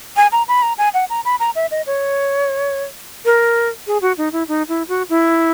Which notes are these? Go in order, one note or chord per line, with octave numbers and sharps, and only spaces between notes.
G#5
A#5
B5
A#5
G#5
F#5
A#5
B5
A#5
E5
D#5
C#5
A#4
G#4
F#4
D#4
E4
D#4
E4
F#4
E4